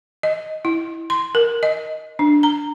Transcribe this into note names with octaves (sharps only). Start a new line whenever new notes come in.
D#5
E4
C6
A#4
D#5
D4
A#5